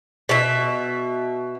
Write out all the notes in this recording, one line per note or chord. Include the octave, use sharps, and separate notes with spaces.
B2 E5